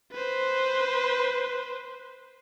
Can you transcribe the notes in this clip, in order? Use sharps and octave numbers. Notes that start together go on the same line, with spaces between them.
B4 C5